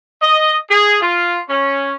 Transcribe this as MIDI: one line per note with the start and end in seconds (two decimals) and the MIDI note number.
0.22 0.55 75
0.70 0.96 68
1.01 1.38 65
1.48 1.93 61